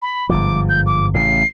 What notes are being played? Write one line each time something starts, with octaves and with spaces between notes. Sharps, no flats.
B5
G1 G#2 F3 D6
G6
D6
A1 A2 C#3 C7